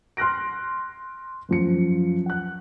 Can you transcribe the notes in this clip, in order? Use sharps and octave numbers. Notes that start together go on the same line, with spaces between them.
C6 F6 F#6 A#6 D7
F#2 F3 C#7
F#5 F#6